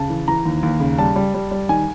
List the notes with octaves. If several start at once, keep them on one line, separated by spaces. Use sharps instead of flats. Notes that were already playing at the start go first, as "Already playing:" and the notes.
Already playing: C#3 A5
E3
E3 A#5
D#2
D#2
C#3
G3 A5
G3
G3
G3
D#3 G#5